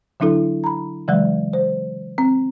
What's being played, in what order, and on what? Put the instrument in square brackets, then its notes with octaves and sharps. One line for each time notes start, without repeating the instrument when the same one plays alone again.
[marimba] D3 F#3 D4 E4 A4
A#5 B5
C#3 E3 F#3 G#3
C5
C4